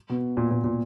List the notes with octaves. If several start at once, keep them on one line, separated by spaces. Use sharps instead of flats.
B2
A#2
A#2
A#2